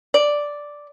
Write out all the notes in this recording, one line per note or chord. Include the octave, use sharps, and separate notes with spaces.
D5